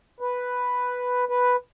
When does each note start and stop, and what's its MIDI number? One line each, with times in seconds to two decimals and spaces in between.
0.20 1.25 71
1.29 1.56 71